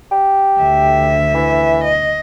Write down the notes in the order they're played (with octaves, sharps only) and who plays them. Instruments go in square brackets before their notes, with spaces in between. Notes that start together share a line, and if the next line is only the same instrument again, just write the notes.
[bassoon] G4
[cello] D2 E5
[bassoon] E3
[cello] D#5